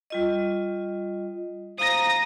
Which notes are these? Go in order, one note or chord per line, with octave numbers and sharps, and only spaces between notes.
G3 F4 D#5
C5 F5 A#5 D#6 A#6